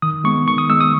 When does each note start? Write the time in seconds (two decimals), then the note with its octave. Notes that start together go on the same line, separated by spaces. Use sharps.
0.02 D#3 D#6
0.24 G#3 B3 C#6
0.47 D#3 C#6
0.58 D#6
0.69 G#3 B3 E6
0.81 D#6